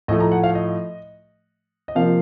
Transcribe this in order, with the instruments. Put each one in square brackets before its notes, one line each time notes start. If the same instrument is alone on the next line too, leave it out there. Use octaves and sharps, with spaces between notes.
[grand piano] A2 F3 A3 D#5
A#5
F#5
F5
D#5
D#5
C3 F3 A#3 F5